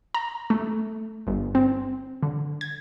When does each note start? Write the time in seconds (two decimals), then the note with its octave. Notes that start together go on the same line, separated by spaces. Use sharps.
0.14 A#5
0.50 A3
1.27 G1
1.55 C4
2.23 D3
2.61 G#6